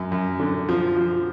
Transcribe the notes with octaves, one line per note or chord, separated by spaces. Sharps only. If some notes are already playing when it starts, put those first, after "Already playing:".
Already playing: F#2
F#2
D3
F3
F3